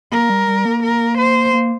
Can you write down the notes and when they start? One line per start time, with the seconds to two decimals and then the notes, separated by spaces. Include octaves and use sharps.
0.12 A#3 A#4
0.30 G3
0.47 G3
0.65 A#3
0.83 A#4
1.18 C5
1.53 A#3